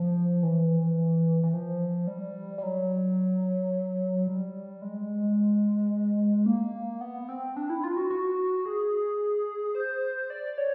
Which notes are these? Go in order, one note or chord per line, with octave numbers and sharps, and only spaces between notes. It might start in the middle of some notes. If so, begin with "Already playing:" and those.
Already playing: F3
E3
E3
F3
G3
G3
F#3
G3
G#3
A#3
B3
C4
D4
E4
F4
F#4
F#4
G#4
C5
D5
C#5